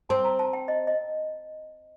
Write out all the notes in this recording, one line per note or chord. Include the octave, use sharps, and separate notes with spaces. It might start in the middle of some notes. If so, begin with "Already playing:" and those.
C4 A5
A#5
A5
G5
D#5
D#5